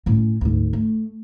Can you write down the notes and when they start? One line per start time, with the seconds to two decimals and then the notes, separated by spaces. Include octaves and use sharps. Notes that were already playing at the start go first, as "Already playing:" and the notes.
0.06 A2 C#4
0.41 D2 G#2
0.73 A3